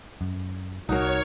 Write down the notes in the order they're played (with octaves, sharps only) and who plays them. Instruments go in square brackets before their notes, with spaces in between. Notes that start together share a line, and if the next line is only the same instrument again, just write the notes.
[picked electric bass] F#2
[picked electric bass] C2 [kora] D#4 A#4 [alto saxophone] F#4 [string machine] C#5